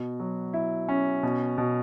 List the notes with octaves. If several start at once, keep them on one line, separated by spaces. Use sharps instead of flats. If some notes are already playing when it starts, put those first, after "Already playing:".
Already playing: B2
F#3
E4
C#4
B2
B2